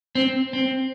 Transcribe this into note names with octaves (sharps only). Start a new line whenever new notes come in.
C4
C4